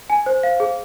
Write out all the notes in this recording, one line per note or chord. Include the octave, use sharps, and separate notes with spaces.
G#5
C5
F5
G#4